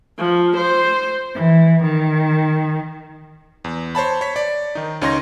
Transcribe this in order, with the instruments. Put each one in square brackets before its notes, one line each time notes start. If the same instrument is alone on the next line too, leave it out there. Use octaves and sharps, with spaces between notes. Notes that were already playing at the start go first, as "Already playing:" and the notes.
[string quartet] F3
C5
E3
D#3
[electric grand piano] E2
C5 C#5 A5 B5
C#5 B6
D5
D#3 D#4
C#2 C#4 D#4 C6 G#6 A#6